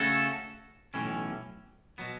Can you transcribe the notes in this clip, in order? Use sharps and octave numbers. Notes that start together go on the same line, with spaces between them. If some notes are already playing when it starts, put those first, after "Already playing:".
Already playing: C#3 A3 C#4 F#4 A4
B1 A2 E3 C#4
B2 F#3 B3